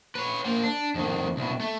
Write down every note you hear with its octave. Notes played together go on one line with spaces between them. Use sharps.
B4 C#5
A#3 C5
D4
F2 D#3
C2 B2
A3